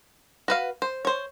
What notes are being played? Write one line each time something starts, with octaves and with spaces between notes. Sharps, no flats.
F#4 B4 F5
C5
C5 C#5